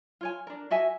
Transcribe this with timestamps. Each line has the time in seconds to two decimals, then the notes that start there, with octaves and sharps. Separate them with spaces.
0.21 F4 C#5 G#5
0.47 D4 A#4
0.70 F#4 D#5 E5 G#5